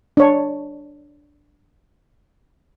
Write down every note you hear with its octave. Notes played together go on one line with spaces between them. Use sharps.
D4 C#5